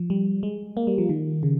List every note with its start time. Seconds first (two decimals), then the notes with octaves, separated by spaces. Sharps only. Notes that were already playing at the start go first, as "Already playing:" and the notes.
Already playing: F3
0.10 G3
0.43 G#3
0.77 A#3
0.87 G3
0.98 F3
1.09 D#3
1.43 C#3